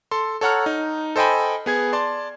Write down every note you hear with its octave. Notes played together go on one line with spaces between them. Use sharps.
A4 C6
A4 C#5 F#5 A#5 F6
D#4
A4 C5 D#5 G5 G#5 B5
B3 G#4 G#6
D5 A5 C6